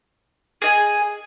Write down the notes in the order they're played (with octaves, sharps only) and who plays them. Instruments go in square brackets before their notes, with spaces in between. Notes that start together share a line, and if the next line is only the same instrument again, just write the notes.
[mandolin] G#4 D#5 G#5